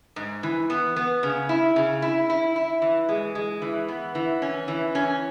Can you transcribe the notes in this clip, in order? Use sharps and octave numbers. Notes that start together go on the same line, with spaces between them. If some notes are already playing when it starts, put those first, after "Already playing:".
G#2
E3
B3
B3
C#3
E4
C#3
E4
E4
E4
E3
G#3
G#3
E3
B3
E3
C#4
E3
C#4